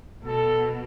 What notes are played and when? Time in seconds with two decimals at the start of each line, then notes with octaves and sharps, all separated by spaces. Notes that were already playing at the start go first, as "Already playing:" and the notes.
0.24 B2 A4